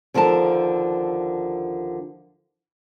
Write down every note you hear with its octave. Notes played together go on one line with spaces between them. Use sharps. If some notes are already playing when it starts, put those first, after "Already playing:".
D#2 D3 F3 A#4 A5